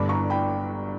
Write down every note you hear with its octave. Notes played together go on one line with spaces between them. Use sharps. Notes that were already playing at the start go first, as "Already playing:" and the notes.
Already playing: G1 G2 D3 B5 D6
A#5 C#6
G5 B5